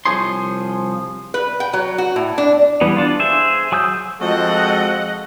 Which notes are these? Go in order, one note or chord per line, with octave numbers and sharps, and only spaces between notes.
C2 F3 G#4 C5 C#5 C6
B4
G5
F#3
F#4
A2
D4
E3 G3 B3
D4 F4
G#4 C5 E5
F#3 G#5 D#6 E6 G6
F3 G#3 C4 F#4 A4 D#5 F#5